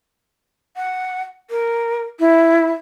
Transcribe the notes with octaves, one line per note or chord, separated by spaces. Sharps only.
F#5
A#4
E4